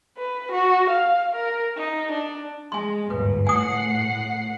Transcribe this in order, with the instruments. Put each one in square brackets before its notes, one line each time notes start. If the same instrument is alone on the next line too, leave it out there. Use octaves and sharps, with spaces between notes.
[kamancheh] B4
F#4
F5
A#4
D#4
D4
[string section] G#3 [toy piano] G#5 C6
[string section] G1 D#2 G#2 [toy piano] B4
[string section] A2 F#5 C7 [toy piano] G#5 D#6